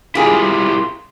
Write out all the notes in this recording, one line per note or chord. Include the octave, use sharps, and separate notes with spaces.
E4 F4 G4 G#4 A#4